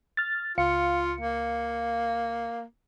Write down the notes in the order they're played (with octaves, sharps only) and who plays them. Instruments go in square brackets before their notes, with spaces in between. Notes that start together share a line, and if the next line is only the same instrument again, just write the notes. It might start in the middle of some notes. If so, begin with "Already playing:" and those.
[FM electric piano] F6 A6
[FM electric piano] C#2 F5 C#7 [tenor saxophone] F4
[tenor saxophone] A#3